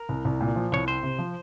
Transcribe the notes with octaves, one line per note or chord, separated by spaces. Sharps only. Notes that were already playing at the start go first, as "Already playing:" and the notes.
Already playing: A#4
C2
C2
A#2
F3
C2 C#5
C4 C5
C3
F3